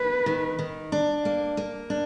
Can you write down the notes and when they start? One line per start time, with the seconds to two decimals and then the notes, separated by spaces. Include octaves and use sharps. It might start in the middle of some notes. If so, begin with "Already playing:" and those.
Already playing: A#3 B4
0.26 D#3
0.59 D#3
0.92 D4
1.25 A#3
1.57 A#3
1.90 D4